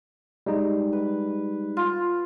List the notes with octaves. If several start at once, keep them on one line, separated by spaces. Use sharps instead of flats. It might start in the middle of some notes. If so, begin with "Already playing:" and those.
G3 G#3 D#4
B4
F4